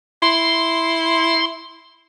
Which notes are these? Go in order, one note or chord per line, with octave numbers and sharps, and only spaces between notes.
E4 C6